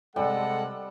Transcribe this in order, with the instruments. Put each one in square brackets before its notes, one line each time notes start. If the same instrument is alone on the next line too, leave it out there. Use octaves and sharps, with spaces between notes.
[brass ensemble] C3 F#5 [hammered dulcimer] G3 [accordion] G#3 A4 [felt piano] D5